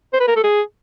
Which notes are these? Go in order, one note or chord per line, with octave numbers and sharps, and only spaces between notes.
C5
B4
A#4
A4
G#4